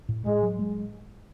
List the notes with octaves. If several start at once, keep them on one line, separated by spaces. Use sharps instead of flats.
A2
A2 G#3
F#3
G#3